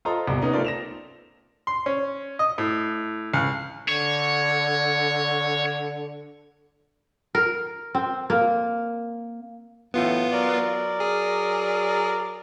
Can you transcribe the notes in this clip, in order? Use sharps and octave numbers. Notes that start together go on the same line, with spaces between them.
F4 A4 C5 D#5 A#5 C6
C2 B2
B3 C#4 D#4 D#5
A3 C4 F4 A#4 D5
A#6 E7 F7
C6
C#4
D#5
A2
C#2
D3 C#5
A#4
C4
A#3
F#2 A2 E3 B3 F4
F#3 A#4 D5
G#4